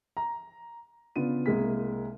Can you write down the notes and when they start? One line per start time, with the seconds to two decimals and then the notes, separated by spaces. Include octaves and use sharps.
0.17 A#5
1.16 C#3 B3 D4 F4 D#7
1.46 C2 G#3 A#3 B6